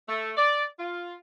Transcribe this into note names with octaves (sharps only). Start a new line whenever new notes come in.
A3
D5
F4